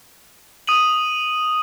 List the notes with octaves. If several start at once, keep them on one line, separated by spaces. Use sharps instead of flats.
D#6 D#7 F#7